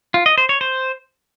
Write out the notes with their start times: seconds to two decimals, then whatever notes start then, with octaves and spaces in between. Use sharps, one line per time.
0.14 F4
0.26 D#5
0.38 C5
0.49 C#5
0.61 C5